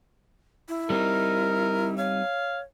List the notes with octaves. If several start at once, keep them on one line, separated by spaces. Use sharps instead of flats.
E4
G3 C4 D#4 A#4
C#5 F5